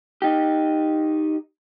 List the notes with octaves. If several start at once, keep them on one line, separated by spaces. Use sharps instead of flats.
D#4 G4